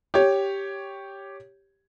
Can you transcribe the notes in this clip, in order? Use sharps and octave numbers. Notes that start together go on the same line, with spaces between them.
G4 C#5